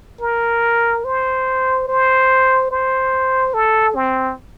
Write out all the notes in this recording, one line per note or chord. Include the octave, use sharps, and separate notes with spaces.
A#4
C5
C5
C5
A4
C4